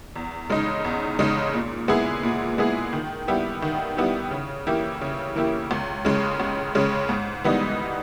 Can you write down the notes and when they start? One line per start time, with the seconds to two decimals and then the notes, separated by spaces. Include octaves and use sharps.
0.16 E2
0.49 C#3 G#3 D#4
0.84 E2
1.19 C#3 G#3 D#4
1.53 A#2
1.88 G#3 B3 E4 G#4
2.23 A#2
2.58 G#3 B3 E4 G#4
2.93 D#3
3.28 G3 B3 E4 G4
3.62 D#3
3.97 G3 B3 E4 G4
4.31 C#3
4.67 E3 A#3 E4 G4
5.01 C#3
5.36 E3 A#3 E4 G4
5.71 C#2
6.05 C#3 G#3 C#4
6.40 C#2
6.75 C#3 G#3 C#4
7.09 G#2
7.44 E3 G3 B3 D#4